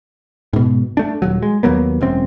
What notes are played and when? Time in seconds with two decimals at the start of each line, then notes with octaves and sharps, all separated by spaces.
0.53 G#2 B2
0.97 A3 D4
1.22 D#1 F#3
1.43 G#3
1.63 D#2 F#3 A#3 B3
2.01 E1 F#2 C4